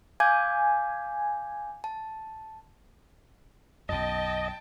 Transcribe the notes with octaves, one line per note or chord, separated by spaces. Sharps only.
F5 G#5 D6 G6
A5
B1 F#2 D#5 G5 A5